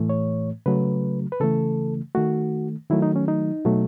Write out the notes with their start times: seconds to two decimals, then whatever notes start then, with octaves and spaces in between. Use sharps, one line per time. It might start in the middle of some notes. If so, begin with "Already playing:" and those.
Already playing: A2 E3 A3
0.10 C#5
0.66 C#3 F#3 A3 B4
1.32 B4
1.40 C#3 E3 A3 A4
2.15 D#3 A3 F#4
2.90 D#3 F#3 A3 E4
3.02 D#4
3.16 C#4
3.28 D#4
3.65 B2 F#3 A3